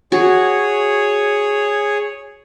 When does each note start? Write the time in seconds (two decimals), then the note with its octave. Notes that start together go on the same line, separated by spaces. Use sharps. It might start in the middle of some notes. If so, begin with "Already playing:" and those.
0.12 F#4 G#4 C#5